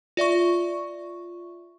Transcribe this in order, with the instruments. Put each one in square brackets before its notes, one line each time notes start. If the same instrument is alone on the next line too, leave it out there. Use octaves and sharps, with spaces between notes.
[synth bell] F4 D5 E5 C#6